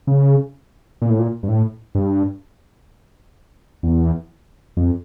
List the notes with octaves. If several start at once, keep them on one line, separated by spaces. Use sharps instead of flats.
C#3
A#2
A2
A#2
G2
A2
G2
E2
F2